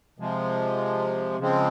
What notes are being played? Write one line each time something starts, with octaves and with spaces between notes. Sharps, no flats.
C3 F3 G#3
C#3 F3 G#3 C4